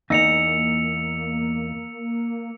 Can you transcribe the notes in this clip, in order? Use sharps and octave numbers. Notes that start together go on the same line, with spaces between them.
E2 A#3 D#4 E6 C#7 F7